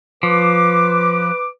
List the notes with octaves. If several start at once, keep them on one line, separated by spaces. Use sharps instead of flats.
F3 B4 D6